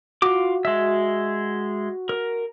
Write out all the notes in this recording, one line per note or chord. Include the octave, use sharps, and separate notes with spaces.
F4 F#4 D6
G#3 E5
A#4